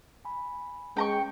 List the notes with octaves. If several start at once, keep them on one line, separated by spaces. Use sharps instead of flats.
G#5 B5
G#3 C#4 G5 A#5 C#6